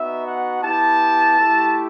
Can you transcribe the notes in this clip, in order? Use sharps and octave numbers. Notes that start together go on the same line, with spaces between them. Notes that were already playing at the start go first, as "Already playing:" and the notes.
Already playing: B3 D#4 F#4 E5
F#5
B3 E4 G4 A5
A3 E4 G4